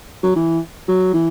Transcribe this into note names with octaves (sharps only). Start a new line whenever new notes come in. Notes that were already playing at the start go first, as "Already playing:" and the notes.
F#3
E3
F#3
E3